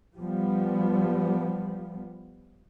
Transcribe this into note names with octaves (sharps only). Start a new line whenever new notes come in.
F3 G3 B3